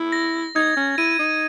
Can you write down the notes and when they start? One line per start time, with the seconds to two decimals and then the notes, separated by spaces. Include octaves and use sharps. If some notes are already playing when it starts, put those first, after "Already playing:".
Already playing: E4
0.12 A#6
0.56 D#4 G#6
0.77 C#4
0.98 E4 D#7
1.19 D#4